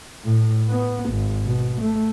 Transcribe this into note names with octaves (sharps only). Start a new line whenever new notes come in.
A2
B3
G#1
B2
A3